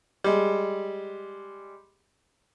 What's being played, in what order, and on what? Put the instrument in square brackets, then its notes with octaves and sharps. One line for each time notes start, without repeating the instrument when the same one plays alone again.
[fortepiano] G3 G#3